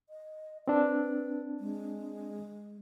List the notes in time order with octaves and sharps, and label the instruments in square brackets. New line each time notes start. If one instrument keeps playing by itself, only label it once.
[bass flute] D#5
[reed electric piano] C4 D4 [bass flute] B4
[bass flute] G#3